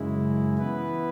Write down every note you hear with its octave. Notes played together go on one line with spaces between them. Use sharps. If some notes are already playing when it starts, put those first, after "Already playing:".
Already playing: F#2 C#3 G#3 E4
E3 B3 E4 B4